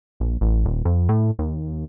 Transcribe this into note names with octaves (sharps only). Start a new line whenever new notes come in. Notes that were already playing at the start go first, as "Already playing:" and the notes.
A#1
A1
D#1
F2
A2
D#2